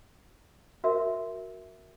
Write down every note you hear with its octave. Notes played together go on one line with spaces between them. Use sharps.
F#4 A#4 E5